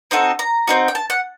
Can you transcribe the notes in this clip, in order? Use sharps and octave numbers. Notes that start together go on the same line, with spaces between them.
C4 D#4 F#4 A4
A#5
C4 D#4 F#4
G5
A5
F#5